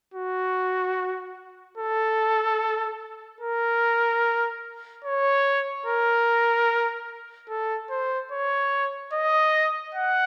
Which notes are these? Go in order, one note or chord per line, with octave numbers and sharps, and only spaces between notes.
F#4
A4
A#4
C#5
A#4
A4
C5
C#5
D#5
F#5